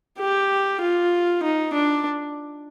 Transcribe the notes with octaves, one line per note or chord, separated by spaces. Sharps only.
G4
F4
D#4
D4